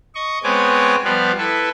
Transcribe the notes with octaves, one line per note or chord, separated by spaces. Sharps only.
D#5 C#6
G#3 B3 C4 C#5 G#5 D6
F3 G3 B3 B4 F5
E4 A4 B4